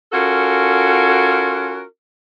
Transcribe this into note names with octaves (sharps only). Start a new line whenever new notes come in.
C#4 F4 F#4 A4 A#4